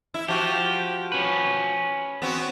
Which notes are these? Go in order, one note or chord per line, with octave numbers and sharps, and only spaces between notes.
E4
F3 F#4 G4
C#4 B4
B3 C4 F#4